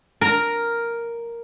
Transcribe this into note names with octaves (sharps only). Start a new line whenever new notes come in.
A#4 A#5